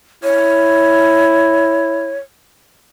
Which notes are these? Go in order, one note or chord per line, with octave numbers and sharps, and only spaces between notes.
E4 C#5